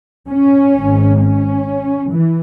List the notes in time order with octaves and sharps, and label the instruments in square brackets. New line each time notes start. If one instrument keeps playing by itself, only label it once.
[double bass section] C#4
G#1 G#2
C#4
E3